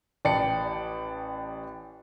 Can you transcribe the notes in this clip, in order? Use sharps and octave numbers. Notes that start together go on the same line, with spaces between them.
A1 D5 G5 A5 C#7